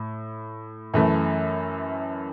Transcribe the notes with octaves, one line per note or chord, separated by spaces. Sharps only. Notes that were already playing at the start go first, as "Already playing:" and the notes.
Already playing: A2
F#2 E3 A3